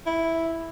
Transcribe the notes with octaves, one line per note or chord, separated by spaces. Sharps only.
E4